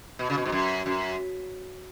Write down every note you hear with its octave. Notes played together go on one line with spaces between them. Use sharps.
B2
C#3
B2
G#2
F#2
F#2